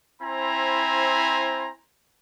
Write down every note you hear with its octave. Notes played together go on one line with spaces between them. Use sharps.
C4 E4 C5 G#5 A#5 B5